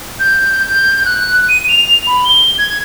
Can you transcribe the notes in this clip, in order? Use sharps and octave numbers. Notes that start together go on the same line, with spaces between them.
G6
G6
F#6
D#7
F7
B5
G7
G#6